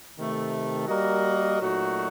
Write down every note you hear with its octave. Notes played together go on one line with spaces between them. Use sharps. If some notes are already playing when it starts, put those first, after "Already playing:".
C3 D#3 A3
G3 A#3 F#4 A#4 D#5
A#2 F#3 A3 D#4 F#4